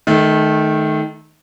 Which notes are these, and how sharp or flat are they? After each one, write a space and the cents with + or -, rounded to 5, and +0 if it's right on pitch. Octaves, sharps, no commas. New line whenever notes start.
D#3 +0 A3 -25